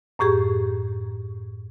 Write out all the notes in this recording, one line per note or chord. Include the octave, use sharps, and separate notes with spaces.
F#2 A2 G4 G#4 C#6